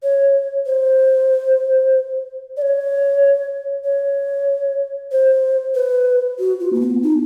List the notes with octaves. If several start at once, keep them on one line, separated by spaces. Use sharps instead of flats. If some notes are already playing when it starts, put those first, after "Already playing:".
C#5
C5
D5
C#5
C#5
C5
B4
F#4
F4
A#3
B3
D#4